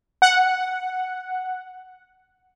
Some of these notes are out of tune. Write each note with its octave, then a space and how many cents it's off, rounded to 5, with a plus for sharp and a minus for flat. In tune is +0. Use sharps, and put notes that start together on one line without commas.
F#5 +0